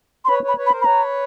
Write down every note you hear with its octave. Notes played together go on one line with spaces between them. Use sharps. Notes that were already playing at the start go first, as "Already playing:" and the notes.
C6
B4 C#5 B5
B4 C#5 B5
B4 C#5
B5
A#4 C5
B5
B4 C#5 A#5